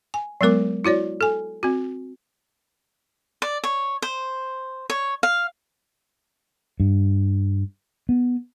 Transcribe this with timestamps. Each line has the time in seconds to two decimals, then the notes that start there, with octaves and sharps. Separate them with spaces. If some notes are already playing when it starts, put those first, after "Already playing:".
0.14 G#5
0.41 F#3 G#3 B3 A#4 D6
0.85 E4 F#4 C#5 D5
1.21 A4 G#5
1.63 C4 F#4
3.42 D5
3.64 C#5
4.02 C5
4.90 C#5
5.23 F5
6.80 G2
8.09 B3